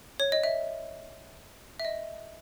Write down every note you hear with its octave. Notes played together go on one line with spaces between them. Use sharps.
C#5
D#5
E5
E5
D#5